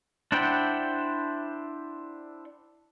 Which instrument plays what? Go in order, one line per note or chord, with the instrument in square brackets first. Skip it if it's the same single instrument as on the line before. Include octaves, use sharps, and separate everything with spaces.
[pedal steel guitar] D4 E4 C5 F#5 G5